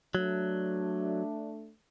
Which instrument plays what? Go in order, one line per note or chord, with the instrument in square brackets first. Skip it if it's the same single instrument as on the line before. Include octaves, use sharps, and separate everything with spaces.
[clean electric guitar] F#3 [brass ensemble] A3 D4